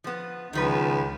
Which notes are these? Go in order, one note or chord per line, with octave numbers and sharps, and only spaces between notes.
F3 B3
C#2 D#3 F3 B4